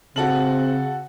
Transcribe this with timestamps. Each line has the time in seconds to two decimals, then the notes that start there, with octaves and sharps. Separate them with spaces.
0.16 C#3 C4 F#4 A4 F#7